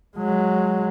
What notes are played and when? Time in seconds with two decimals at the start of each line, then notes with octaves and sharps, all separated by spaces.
0.17 F#3 G#3